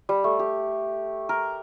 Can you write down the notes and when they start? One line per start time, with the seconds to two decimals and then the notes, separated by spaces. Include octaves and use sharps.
0.09 G3
0.24 A3
0.39 G4
1.29 A#4